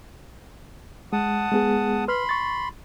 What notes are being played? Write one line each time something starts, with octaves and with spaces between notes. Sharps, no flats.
G#3 F#5 A5 D#6
G#3 B3 G#4
B4 B5 C6 F6
C#6 A6